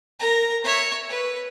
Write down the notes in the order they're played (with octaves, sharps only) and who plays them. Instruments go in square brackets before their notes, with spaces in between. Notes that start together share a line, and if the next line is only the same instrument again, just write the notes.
[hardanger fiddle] A#4 A#5
C#5 E5
B4